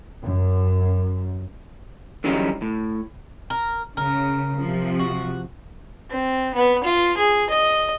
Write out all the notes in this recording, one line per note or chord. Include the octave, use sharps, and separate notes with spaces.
F#2
D3 E3 F#3 G3 C#4 D#4
A2
A#4
C#3 A#4
C3 F3
F#4
C4
B3
F4
G#4
D#5